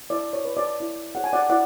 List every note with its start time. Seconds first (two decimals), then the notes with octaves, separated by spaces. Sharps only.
0.10 E4 D5
0.33 C#5
0.45 B4
0.57 D5
0.80 E4
1.15 G#4 C#5 F#5
1.24 G#5
1.33 D5 F#5
1.49 E4 D5 F#5